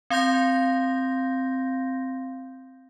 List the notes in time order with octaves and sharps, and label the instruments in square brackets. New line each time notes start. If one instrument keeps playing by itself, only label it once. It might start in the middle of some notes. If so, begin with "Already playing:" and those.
[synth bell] C4 F5 C6 G6 A#6